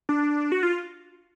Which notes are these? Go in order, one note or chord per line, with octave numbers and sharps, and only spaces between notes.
D4
F#4
F4